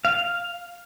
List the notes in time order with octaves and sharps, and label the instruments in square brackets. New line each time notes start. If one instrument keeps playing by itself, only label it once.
[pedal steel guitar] F5